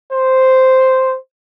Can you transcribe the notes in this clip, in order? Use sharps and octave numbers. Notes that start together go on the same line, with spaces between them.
C5